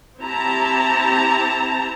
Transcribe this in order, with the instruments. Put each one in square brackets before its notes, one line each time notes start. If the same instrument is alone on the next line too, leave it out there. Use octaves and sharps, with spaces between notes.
[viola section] C4 E4 G4 A5 A#5